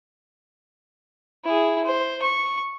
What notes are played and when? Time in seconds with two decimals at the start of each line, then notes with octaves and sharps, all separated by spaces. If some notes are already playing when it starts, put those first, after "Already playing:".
1.45 E4 G#4
1.84 C5
2.22 C#6